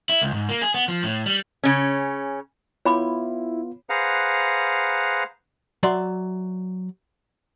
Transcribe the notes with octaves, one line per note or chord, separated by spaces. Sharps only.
E4
C#2
G#2
A#3
G#4
B3
F3
A2
G3
C#3 C#4
B3 E4 F4 C#5 B5 D6
G#4 B4 C5 F5 F#5 A#5
F#3 D5 E5 C6